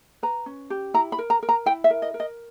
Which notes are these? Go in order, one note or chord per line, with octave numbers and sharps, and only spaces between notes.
B4 A#5
C#4
G4
E4 A#5
B5
A#4
A#5
A#4
A#5
E4 G5
E5
A#4
D#5
A#4
D#5